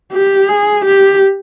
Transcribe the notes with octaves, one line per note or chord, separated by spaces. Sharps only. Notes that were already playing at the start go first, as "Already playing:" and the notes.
G4
G#4
G4